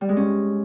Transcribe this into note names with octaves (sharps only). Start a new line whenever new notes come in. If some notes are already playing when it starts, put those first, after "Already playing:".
G3
G#3
C#4